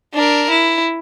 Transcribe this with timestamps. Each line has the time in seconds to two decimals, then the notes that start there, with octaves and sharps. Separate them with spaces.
0.14 D4 A#4
0.51 E4